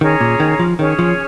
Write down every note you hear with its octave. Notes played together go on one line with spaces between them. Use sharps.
D#3 C#4 G#4 C#5 A#5
A#2
D#3
F3
D#3 C#4 G#4 C#5
F3